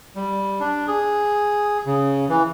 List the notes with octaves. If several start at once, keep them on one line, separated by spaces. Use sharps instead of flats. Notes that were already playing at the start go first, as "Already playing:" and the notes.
G3
D4
G#4
C#3
E3